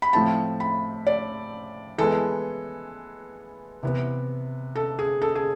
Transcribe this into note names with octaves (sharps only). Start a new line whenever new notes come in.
B5
A2 F3 A3 C4 A5
B5
D5
E3 G#3 B3 A4
C3 E3 B3
A4
G#4
A4
G#4